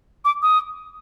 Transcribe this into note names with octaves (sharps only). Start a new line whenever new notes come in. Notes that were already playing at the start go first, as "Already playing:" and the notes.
D6
D#6